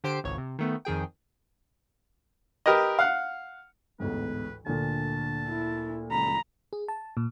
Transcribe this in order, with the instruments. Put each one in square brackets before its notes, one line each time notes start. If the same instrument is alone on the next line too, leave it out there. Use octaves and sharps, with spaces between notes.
[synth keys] D3 G4 C5 C7 D7
G#1 C#2 C#5
C3
D#3 A3 B3
F2 D#3 G#4 G5
[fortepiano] G4 A#4 B4 D#5
F5 F#5
[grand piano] A1 D2 G#2 [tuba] B3 [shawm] B4
[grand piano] D2 A#2 [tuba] D3 [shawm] A5
[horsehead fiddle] E4
[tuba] C#2 [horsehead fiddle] A#5 [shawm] B5
[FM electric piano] G#4
A5
A#2